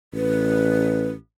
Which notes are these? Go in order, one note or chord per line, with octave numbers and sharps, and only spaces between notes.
A1 B4